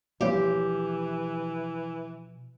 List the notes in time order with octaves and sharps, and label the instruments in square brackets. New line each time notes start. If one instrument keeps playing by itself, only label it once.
[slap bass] B2 F3 [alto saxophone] E3 [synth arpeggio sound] G3 A#3 C#5 [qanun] G4